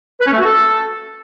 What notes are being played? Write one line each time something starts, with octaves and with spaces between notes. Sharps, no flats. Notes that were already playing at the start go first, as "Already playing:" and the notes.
B4
C#4
A3
F#4
A4